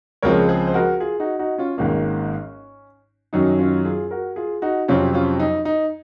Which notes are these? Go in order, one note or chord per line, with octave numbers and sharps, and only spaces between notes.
C#2 C#3 F3 G#3 C4 A#4 C#5
G#4 C5
C5
F#4 A#4
F4 G#4
D#4 F#4
D#4 F#4
C#4 F4
G#1 G#2 D#3 A#3 C#4
F#2 D#3 F#3 C#4 D#4
C#4 F4
F4 G#4
F#4 A#4
F4 G#4
D#4 F#4
F2 C3 F#3 C4 C#4 F4
C#4 F4
D#4
D#4